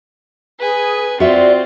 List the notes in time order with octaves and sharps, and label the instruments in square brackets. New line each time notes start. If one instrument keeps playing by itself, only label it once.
[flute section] G#4 [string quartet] B4 G#5
[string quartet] C4 F4 [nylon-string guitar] F#4 E5 [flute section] D5